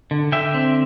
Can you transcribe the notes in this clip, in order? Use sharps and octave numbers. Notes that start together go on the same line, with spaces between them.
D3
D3 E5 G5
C4